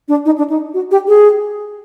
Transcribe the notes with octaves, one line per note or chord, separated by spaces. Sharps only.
D4
D#4
D4
D#4
F#4
G4
G#4